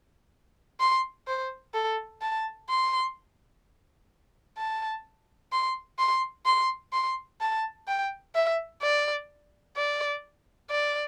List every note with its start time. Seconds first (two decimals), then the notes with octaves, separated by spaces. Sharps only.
0.80 C6
1.27 C5
1.75 A4
2.22 A5
2.69 C6
4.58 A5
5.52 C6
5.99 C6
6.46 C6
6.93 C6
7.41 A5
7.88 G5
8.35 E5
8.82 D5
9.76 D5
10.70 D5